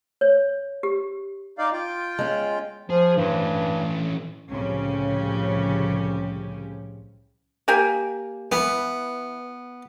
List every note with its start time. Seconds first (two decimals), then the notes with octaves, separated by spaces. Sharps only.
0.21 C#5
0.83 G4
1.58 D#4 D5 F5
1.73 F4 G5
2.19 G#3 C#4
2.90 F3 G#4
3.17 G2 E3 C#4
4.51 C2 A2 C#3 F3 C#4 G4
7.68 A#3 G4 G#5
8.52 E3 B3